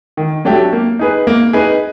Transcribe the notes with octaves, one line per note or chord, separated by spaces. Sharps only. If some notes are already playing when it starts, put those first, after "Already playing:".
D#3
F#3 A3 D4 G4
A#3
D#4 G#4 B4
A#3
D#4 G#4 B4